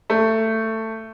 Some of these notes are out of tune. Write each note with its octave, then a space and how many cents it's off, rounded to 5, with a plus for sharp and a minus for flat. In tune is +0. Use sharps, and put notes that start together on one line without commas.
A3 +15